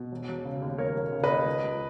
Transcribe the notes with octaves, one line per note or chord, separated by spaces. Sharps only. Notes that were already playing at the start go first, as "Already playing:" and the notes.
Already playing: B2
E1
E1
C#3
D#2
E1 A#4 C#5
E1
C#3
B4 D#5
D#2
C#2
C#2